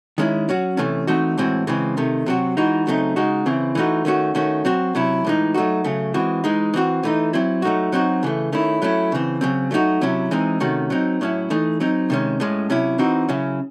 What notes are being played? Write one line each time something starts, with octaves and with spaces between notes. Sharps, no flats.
D#3 G#3 C#4 E4
F#3 C#4 F#4
C3 E3 A3 C#4
E3 A3 C4 D#4 F#4
A2 E3 G#3 C4 F#4
C#3 E3 G#3 C4
C3 D#3 A3
C3 F#3 C4 F#4
E3 G#3 D#4 F#4
C#3 F#3 A3 C4 D#4
C#3 G#3 D#4 F#4
C#3 E3 C4 E4
E3 A3 D#4 F#4
D#3 A3 C#4 F#4
D#3 A3 C#4 F#4
F#3 C4 F#4
C3 F#3 C#4 E4
A2 E3 G#3 D#4
F#3 A3 D#4 F#4
C#3 F#3 A3
E3 G#3 C4 F#4
E3 G#3 D#4
E3 C4 F#4
E3 A3 D#4
F#3 C4 E4
F#3 A3 D#4 F#4
F#3 C4 D#4 F#4
C#3 E3 A3
D#3 A3 C#4 E4
F#3 A3 C#4 E4
C#3 E3 C4
C#3 F#3 C4
F#3 A3 D#4 F#4
C3 F#3 C#4 E4
E3 G#3 C4 D#4
C3 D#3 A3 C#4 F#4
F#3 C4 D#4
A2 F#3 C#4 E4
E3 A3 D#4
F#3 C4 D#4
C3 D#3 G#3 C#4
A2 G#3 C#4
C3 F#3 C#4 E4
E3 C4 D#4 F#4
C#3 F#3 C#4 E4